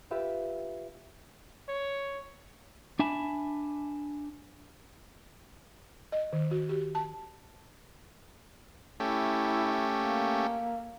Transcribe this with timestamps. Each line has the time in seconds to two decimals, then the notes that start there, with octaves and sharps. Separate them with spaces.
0.11 F4 G4 B4 E5
1.68 C#5
2.99 D4 E5 G#5 A5 B5
6.12 D#5
6.33 D#3
6.51 F#4
6.69 G4
6.95 A5
9.00 A3 C#4 E4 G4
9.95 A#3